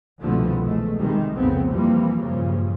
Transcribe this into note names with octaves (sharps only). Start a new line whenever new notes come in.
C2 B2 D3 F3 A3 B3
E2 G#3 A3
C3 D#3 G3 G#3
F1 C2 C#3 A3 B3 C4
C3 E3 F3 G3 A#3
F#1 G2 A#2 C#3 F3